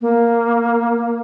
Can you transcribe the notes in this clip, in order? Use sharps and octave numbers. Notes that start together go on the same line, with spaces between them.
A#3